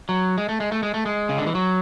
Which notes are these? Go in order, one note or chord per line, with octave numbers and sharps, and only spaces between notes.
F#3
G#3
A3
G#3
A3
G#3
A3
G#3
C#3
D3
E3
F#3